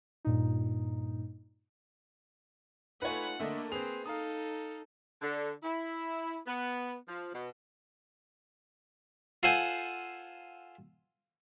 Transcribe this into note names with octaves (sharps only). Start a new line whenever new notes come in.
G2 A#2 D#4
A3 D#4 F4 B4 C#5 F#5 G#5
D3 A3 A#3 D4 D#5 E5
C4 G#4 B4 C5 F7
D#4 A4 F5 A#5 D#6
D3
E4
B3
F3
B2
F4 A4 C5 F#5 G#5